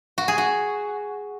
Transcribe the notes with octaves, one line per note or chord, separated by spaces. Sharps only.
F#4
G#4
F#4